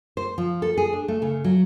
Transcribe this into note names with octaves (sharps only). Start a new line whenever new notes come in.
C5
F3
A4
G#4
D4
A3
C#3
F#3